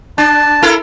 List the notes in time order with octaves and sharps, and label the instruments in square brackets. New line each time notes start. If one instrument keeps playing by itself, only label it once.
[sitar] D4 [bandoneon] A5
[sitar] E4 A4 A#4